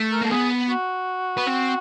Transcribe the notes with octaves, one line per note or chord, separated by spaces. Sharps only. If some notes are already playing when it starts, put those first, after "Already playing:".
Already playing: A3
A#4
A#3 A4
B3 G#4
F#4
B3
C4